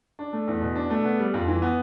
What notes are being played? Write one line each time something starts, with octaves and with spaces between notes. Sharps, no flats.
D4
A3
E2
B2
D4
A3
B3
G3
F2
E3
B3